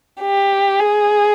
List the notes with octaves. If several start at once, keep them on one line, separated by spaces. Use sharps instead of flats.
G4
G#4